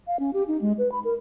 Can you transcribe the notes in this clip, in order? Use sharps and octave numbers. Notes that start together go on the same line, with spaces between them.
F5
C#4
G4
D#4
G#3
B4
B5
A#4